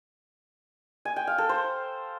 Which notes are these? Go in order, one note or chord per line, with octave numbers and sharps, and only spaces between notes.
G#5
G5
F5
A4
C5